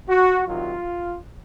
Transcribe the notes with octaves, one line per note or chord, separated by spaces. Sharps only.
F#4
C3 D#3 F#3 F4